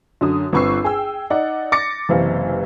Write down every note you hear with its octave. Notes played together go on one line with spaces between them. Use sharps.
F#2 D3 D#6
G1 C4 B4 C#6 E6 C7
G#4 G5 E6
D#4 D5 F#5
D6 A6 A#6 C#7
F#1 C3 E3 F5